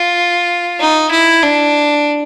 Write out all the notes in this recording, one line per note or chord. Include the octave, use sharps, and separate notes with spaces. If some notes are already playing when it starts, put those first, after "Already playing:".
Already playing: F4
D#4
E4
D4